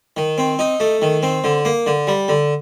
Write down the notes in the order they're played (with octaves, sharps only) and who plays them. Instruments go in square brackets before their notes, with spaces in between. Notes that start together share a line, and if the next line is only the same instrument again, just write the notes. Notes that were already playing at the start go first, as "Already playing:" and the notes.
[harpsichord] D#3
C4
D#4
A3
D#3
C4
D3
A#3
D3
G3
D3